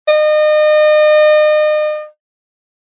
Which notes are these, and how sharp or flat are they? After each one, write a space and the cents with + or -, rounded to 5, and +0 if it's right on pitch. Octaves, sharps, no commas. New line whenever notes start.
D#5 -35